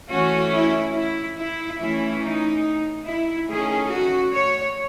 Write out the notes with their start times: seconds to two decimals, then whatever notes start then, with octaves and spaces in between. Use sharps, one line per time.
0.11 E3 A3 C#4 F#4
0.53 E4
0.95 E4
1.38 E4
1.80 E3 A3 C#4 E4
2.22 D#4
3.07 E4
3.49 D#3 A3 C#4 G#4
3.92 F#4
4.34 C#5